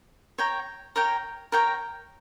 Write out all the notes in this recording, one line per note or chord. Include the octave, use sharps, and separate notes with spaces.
C#5 G5 A#5
A#4 C#5 G5 A#5
A#4 C#5 G5 A#5